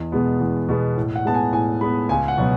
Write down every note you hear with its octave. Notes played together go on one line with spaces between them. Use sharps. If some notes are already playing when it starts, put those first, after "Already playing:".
Already playing: E2 D#5
B2 G#3 B3
E2
B2 G#3 B3
A2
F#5
G#3 B3 A5
G#5
A2 G#5
G#3 B3 B5
C#2 G#5
F#5
B2 F#3 B3